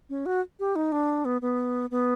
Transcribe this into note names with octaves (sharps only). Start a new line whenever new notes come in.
C#4
F#4
G4
D#4
D4
B3
B3
B3